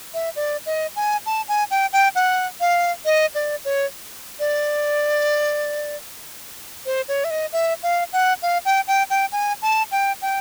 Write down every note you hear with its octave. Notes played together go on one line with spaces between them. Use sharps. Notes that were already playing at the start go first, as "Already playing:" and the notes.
E5
D5
D#5
G#5
A5
G#5
G5
G5
F#5
F5
D#5
D5
C#5
D5
C5
C#5
E5
D#5
E5
F5
F#5
F5
G5
G5
G5
G#5
A5
G5
G5